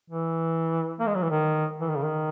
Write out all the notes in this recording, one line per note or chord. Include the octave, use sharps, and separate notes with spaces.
E3
A#3
G#3
F#3
E3
D#3
E3
D#3
C#3
D#3